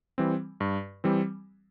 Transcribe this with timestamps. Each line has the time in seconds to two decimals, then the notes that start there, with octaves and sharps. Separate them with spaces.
0.18 E3 G3 C4
0.60 G2
1.04 E3 G3 C4